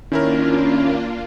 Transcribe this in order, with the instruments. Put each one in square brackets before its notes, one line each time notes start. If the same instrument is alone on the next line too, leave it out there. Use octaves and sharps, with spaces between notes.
[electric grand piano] D#3 E4 A#4 [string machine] A#3 D4 F4 [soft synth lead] C#4